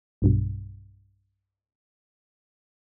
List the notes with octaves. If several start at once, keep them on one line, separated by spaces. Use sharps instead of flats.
B1 G2 B2